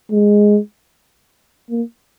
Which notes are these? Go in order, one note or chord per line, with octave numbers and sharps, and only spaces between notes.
G#3
A#3